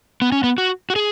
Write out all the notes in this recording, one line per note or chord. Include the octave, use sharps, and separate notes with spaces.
B3
C#4
B3
F#4
F#4
G#4